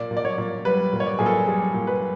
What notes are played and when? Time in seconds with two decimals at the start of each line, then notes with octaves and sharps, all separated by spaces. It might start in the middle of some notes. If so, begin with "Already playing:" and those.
Already playing: A#2 D5
0.11 A#2
0.17 D5
0.25 C#5
0.38 A#2
0.65 G3 B4
0.93 A#2
1.00 C#5
1.06 D5
1.19 A#2 G#4
1.26 A4
1.47 G3 G#4
1.74 A#2
1.87 B4